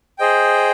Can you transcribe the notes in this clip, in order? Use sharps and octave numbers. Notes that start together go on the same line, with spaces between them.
G#4 C5 D#5 G5